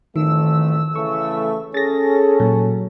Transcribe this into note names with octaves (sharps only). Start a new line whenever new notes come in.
A1 F2 D#3 A3 E6
C#3 E3 A3 C#6
C#4 G#4 A4 A6 A#6
A#2 F#3